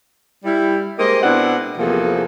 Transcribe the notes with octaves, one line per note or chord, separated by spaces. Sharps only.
G3 E4
G#3 A#3 G4 C5 D#5
B2 B3 C4 D4 E4 F#5
E2 C3 F3 A#3 G#4 A4